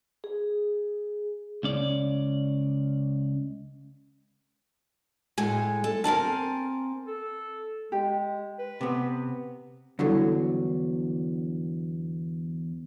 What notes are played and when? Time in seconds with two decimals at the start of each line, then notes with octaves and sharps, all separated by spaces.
0.24 G#4
1.63 C#2 C#4 D5
5.38 A2 G#3 A3 G#5
5.84 A4
6.04 A#3 C4 A#4 G#5 A5
7.07 A4
7.92 G#3 G4
8.59 B4
8.81 C3 B3
9.99 E2 D3 F#3 G3 E4 A4